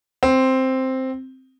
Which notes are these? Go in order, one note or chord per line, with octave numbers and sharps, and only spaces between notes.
C4